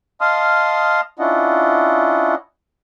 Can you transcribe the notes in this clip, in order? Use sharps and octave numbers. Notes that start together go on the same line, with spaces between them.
D#5 F5 A5 C6 D#6 F6
C#4 D4 E4 F4 D#5 F#5